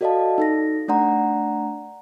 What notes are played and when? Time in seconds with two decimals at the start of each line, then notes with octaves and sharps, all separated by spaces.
0.01 F#4 A4 D5 D#5 F5 A5
0.38 D#4 A4 A#6
0.88 A3 D4 D5 F#5 A#5 C6